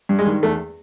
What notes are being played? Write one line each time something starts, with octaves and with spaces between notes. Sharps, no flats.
G2
G#3
D#3
E2 A3